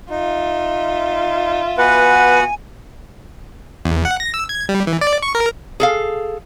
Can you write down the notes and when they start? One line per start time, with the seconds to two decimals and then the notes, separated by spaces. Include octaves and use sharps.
0.10 D#4 F4 E5
1.78 B3 F#4 B4 F#5 G#5
3.85 E2
4.05 F#5
4.20 A#6
4.34 E6
4.49 G#6
4.69 G3
4.87 E3
5.01 D5
5.23 C#6
5.35 A#4
5.80 G#4 A4 F5